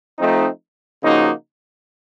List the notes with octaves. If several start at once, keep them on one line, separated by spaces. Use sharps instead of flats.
F3 A3 C4 D#4
C#3 F3 A#3 D#4 F#4